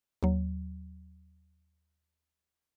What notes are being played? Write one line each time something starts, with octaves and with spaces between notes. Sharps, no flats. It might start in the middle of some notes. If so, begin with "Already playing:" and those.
D#2 F#3